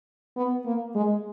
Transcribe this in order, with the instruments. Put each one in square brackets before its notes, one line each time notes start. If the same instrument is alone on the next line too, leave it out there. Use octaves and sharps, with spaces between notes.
[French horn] B3
A#3
G#3